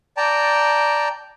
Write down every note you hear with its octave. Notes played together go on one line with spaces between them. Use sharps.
D5 G5 A5 A#5